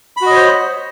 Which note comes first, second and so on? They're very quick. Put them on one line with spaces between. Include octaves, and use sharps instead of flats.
B5 F#4 D#5 C#5 C5